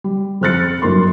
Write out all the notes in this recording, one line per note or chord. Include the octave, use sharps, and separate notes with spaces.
G3
F2 C5 F6 F#6 A6 C#7
G1 F#2 A#4 C6